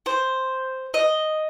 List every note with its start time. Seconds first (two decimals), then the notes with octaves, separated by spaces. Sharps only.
0.06 C5
0.94 D#5